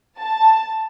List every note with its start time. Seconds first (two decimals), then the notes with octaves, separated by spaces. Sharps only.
0.18 A5